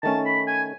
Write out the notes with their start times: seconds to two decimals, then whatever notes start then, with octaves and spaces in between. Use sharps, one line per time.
0.03 D#3 A3 C#4 A5
0.26 B5
0.47 G#5